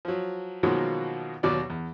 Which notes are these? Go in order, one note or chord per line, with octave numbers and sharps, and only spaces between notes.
F3 F#3
B2 D#3 F3 F#3 G#3 A#3
D#2 B2 F#3 F#4 D5
E2